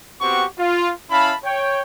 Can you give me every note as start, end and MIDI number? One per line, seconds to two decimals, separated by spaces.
0.21 0.45 59
0.21 0.45 60
0.21 0.45 66
0.21 0.45 67
0.21 0.45 78
0.21 0.45 85
0.58 0.90 65
1.11 1.33 61
1.11 1.33 64
1.11 1.33 77
1.11 1.33 81
1.11 1.33 83
1.44 1.82 73
1.44 1.82 79